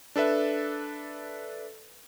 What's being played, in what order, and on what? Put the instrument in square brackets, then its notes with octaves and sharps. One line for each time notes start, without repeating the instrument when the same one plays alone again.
[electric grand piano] D4 A4 B4 E5